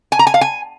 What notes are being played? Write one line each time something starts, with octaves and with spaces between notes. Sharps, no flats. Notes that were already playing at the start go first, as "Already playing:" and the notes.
G#5
A#5
G#5
F5
G#5